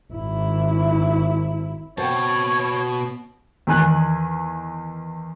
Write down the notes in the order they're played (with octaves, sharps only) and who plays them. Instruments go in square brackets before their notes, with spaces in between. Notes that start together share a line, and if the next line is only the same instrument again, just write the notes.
[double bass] G#1 E4
[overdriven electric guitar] B2 A5 [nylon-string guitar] C5 F#5 G5 [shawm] C#5
[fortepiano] E2 D#3 G#5 F#6